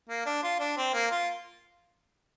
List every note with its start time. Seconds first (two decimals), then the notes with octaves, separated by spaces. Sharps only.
0.09 A#3
0.26 D4
0.43 F4
0.59 D4
0.77 C4
0.94 A#3
1.11 F4